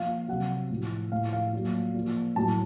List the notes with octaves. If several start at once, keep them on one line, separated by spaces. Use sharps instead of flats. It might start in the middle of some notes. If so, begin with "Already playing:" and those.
Already playing: A#2 F3 F5
C3 F#3 F#5
A2 F3
A2 F3 F5
F5
A#2 F#3
A#2 F3
A2 F#3 A5